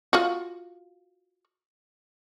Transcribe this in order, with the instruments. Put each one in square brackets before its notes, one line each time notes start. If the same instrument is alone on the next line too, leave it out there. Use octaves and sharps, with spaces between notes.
[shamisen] F4 F#4